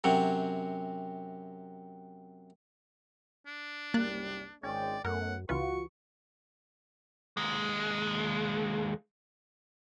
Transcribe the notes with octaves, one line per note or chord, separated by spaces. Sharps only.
F#2 C3 F#3
D4
F#1 C2 G3 A#3 F#6 A6
G#1 G#3 C#4 D5 G5
F#2 A3 B3 A#4 F#5
C#2 E3 F4 F#4 B4 C#6
D#2 G#3